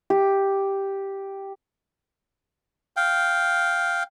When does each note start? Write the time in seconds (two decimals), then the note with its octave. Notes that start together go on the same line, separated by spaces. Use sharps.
0.10 G4
2.96 F5 G5